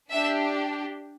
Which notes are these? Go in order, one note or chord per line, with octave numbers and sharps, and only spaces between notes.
D4 G4 E5